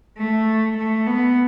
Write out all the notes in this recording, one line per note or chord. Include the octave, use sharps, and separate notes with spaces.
A3
A3
B3